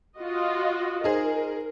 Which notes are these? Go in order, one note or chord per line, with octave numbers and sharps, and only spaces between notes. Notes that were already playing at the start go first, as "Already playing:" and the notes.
F4 F#4 D#5
D#4 G#4 A#4 C5